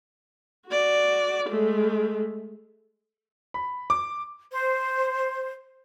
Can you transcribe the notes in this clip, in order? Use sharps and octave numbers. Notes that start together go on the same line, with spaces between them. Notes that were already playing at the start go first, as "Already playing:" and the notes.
F#4 D5
G#3 A3
B5
D6
C5